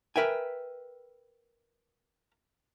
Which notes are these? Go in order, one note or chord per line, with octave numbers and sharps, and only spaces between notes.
A#4 B4 E5 G5 G#5